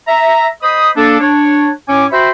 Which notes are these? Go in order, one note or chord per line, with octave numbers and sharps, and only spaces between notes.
E5 A#5
C5 D#5 B5 D#6
A#3 D4 A4
D4 C#5
A2 C#4 C#5 G#5 D6
F#4 C5 E5 G5 B5 C6